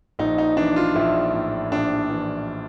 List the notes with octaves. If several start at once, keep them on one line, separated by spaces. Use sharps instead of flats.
A#1 D#4
D#4
E3 D4
F4
A#1 E4
A2
A#1 D4
E3